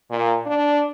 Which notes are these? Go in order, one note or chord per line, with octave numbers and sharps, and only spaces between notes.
A#2
D4